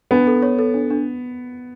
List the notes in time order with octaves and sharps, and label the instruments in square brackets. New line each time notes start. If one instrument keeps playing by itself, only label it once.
[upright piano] B3 [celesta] D4
[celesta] A4
C#5
A4
D4
D4